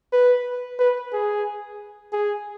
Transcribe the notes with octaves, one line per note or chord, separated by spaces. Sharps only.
B4
B4
G#4
G#4